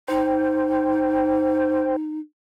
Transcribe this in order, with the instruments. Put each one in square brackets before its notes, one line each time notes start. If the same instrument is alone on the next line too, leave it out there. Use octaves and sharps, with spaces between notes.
[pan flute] D#4 [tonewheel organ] C5 G5